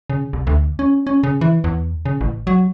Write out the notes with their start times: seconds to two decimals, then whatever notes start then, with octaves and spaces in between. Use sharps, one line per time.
0.10 C#3
0.33 C2
0.47 D2
0.79 C#4
1.07 C#4
1.23 C#3
1.41 E3
1.64 E2
2.06 C#3
2.21 A1
2.47 F#3